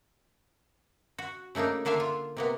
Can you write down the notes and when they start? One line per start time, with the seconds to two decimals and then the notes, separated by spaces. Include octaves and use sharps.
1.18 F#4
1.55 C#3 A3 A#3 D4 D#4
1.85 D3 A#3 D4 E5 F5
2.00 F4
2.37 C3 A#3 B3